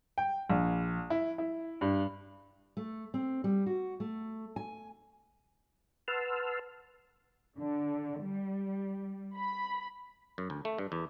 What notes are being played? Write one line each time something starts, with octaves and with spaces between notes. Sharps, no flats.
G5
A#1
E4
E4
G2
A3
C4
G3
F#4
A3
G#5
B4 F#5 A5 C6 E6 F6
D3
G3
B5
F#2
D2
A3
G2
E2